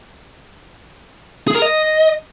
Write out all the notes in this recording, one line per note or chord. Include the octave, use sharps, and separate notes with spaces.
G#4
A#4
D#5